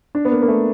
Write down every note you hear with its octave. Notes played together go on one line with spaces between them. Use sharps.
D4
B3
A#3
A#3
A3